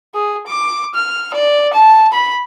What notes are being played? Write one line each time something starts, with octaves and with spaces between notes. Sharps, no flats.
G#4
D6
F6
D5
A5
B5